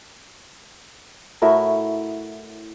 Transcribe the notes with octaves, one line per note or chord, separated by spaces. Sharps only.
A2 E4 F#4 A#4